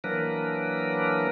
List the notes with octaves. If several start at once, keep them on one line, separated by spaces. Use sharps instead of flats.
E3 F#3 A#3 D4 A#4 B4